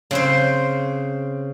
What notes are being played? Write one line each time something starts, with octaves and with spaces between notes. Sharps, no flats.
C#3 C4 C5